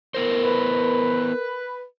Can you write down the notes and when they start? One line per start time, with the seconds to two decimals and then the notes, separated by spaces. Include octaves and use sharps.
0.14 B3 E4 A#4 C5
0.44 B4